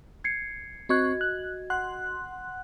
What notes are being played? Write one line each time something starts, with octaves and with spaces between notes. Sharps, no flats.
G#6 C7 C#7
C4 F#4 D#5 C#6 F#6 G#6
F#6
F#5 C6 F#6